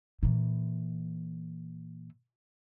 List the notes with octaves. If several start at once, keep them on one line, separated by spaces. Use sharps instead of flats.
A#2 E3